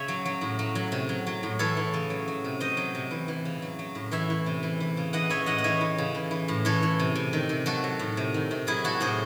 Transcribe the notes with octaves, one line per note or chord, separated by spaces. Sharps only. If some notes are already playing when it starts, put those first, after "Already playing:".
Already playing: C#3 C#5 E5
F#3
F#3
A2
F#3
F#3
C3
F#3
F#3
A2
E3 A4 C#5
E3
C#3
F#3
F#3
C3
F#3 C5 D#5
F#3
C3
E3
E3
C#3
F#3
F#3
A2
E3 C#5 E5
E3
C3
E3
E3
C#3
E3 D#5 F#5
E3 C#5 E5
A2 D#5 F#5
D#5
E3 C#5 E5
E3
C#3
E3
E3
A2
E3 A4 C#5
E3
C3
C3
D#3
C3
F#3 F#4 A4
F#3
A2
C3
D#3
C3
F#3 E4 G#4
F#3 F#4 A4
A2 G#4 C5